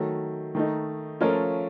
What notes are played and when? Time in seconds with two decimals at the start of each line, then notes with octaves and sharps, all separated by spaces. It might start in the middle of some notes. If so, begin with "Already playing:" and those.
Already playing: D#3 F#3 A3
0.55 D#3 A3 D#4
1.21 F3 A3 C#4 F4 A#4